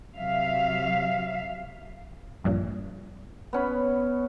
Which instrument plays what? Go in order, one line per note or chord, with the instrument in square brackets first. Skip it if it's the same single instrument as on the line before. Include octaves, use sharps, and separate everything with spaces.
[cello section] C3 F#3 E5 F5
[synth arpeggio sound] A#1 G2 A#2
[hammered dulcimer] B3 C#4 B5